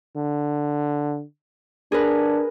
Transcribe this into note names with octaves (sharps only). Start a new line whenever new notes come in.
D3
D4 G#4 A#4 B4